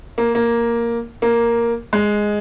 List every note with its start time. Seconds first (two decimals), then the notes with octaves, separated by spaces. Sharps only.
0.18 A#3
0.35 A#3
1.22 A#3
1.93 G#3